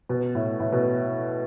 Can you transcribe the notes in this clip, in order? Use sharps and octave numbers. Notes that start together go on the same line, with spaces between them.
B2
A2
A2
B2